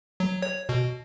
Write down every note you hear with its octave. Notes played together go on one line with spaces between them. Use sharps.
F#3
C#5
B2